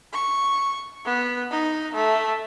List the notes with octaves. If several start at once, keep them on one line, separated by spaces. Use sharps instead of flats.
C#6
B3
D#4
A3